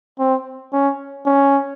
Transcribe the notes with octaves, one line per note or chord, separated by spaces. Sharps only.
C4
C#4
C#4